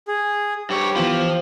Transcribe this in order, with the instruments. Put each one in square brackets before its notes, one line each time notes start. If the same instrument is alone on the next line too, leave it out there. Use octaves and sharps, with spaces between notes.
[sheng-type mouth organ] G#4
[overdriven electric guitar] G2 C#5 [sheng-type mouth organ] G4
[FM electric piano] E3 B3 F4 [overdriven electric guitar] F3